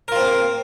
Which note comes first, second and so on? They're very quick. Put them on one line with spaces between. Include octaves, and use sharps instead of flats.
A#4 F4 C4 A#3